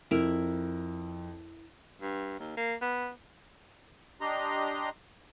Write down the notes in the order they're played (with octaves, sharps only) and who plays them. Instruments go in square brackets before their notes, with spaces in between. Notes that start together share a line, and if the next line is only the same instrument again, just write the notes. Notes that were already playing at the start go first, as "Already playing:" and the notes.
[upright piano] F2 [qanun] E4 A#4
[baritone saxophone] G2
D#2
A#3
B3
[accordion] D4 G4 D#5 A#5 C6